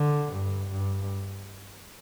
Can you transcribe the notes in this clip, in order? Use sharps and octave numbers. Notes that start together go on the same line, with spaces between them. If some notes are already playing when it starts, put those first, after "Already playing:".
Already playing: D3
G2
G2